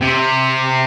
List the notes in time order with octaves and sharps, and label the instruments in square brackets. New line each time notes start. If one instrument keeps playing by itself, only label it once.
[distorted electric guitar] C3